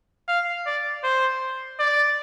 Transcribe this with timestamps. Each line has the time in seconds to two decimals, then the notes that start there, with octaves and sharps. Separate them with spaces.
0.28 F5
0.66 D5
1.04 C5
1.79 D5